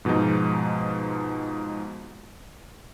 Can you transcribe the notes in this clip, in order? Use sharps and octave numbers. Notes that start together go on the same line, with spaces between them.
G#2 B2 F3 G#3 D#4